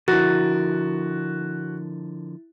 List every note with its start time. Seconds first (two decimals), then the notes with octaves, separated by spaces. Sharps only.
0.08 D3 F3 E4 F#4 A#4 A6